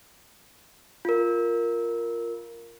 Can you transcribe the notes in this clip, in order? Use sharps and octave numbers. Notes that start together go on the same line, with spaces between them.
F4 A#4